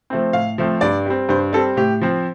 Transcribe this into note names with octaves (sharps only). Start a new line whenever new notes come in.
F3 A3 C4
A2 F5
F3 A3 C4
G2 D5
G3 C4
G2 C5
G3 C4 A4
A2 G4
F3 C4